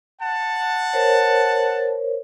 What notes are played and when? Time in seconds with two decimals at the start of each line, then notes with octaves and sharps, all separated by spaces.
0.21 F#5 A5
0.93 A#4 C5 C#5